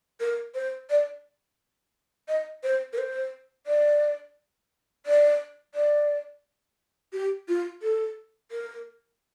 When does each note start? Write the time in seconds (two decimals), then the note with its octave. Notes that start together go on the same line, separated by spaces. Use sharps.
0.20 A#4
0.55 C5
0.90 D5
2.28 D#5
2.63 C5
2.93 A#4
2.98 C5
3.67 D5
5.06 D5
5.75 D5
7.13 G4
7.48 F4
7.82 A4
8.52 A#4